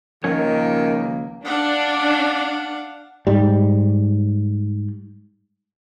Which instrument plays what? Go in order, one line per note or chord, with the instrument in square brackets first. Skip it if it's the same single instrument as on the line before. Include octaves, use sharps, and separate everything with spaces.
[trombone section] C#2 A#3 [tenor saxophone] D#3 [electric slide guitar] F3 C#4 C#5
[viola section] D4 [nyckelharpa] F5 F#5
[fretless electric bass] G#2 G3